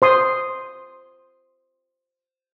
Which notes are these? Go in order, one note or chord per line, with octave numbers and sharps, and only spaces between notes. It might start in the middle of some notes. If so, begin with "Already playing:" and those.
C5 C6 D#6